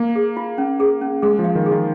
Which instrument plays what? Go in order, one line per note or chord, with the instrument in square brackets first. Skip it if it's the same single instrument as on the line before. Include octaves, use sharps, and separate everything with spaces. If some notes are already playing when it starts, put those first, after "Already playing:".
Already playing: [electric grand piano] A#3
[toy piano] G#4
F4
C#4
G#4
C#4
[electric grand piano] G#3 [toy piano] G#4
[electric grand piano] F3
[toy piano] F5
[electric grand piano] D#3
[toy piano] G#4
[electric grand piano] D#3